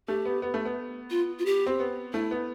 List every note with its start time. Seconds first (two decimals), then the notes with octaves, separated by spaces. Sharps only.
0.08 A3 G4
0.25 B3
0.42 B3
0.54 A3
0.65 B3
1.10 F4
1.39 F4
1.46 G4
1.66 C4
1.80 B3
2.13 A3 E4
2.31 B3